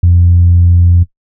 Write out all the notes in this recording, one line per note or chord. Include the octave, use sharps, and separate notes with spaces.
F2